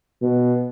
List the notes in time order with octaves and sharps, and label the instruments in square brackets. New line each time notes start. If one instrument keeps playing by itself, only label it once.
[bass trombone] B2